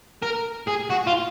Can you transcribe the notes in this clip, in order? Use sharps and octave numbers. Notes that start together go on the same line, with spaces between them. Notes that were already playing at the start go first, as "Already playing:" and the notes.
A#4
G#4
F#4
F4